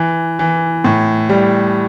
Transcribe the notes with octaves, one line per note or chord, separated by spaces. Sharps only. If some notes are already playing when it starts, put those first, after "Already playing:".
Already playing: E3
E3
A2
G3